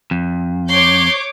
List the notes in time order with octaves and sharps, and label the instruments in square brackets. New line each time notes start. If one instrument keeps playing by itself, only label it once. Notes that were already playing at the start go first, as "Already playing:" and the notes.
[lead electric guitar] F2
[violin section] C#5 D6 G6 [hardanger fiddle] C6